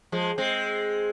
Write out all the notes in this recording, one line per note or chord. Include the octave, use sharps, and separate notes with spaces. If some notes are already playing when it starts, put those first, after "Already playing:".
F3 G#3
G#3 C4